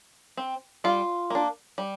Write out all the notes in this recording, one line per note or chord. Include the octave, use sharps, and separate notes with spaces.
C4
G3 F4
A#3 D4
G3